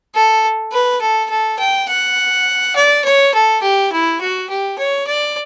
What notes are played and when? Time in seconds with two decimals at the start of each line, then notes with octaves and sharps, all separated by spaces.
0.15 A4
0.72 B4
1.01 A4
1.30 A4
1.59 G5
1.89 F#5
2.76 D5
3.04 C#5
3.34 A4
3.62 G4
3.92 E4
4.21 F#4
4.50 G4
4.78 C#5
5.07 D5